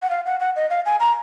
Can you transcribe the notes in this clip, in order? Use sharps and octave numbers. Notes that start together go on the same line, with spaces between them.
F#5
F5
F#5
F#5
D#5
F5
G#5
A#5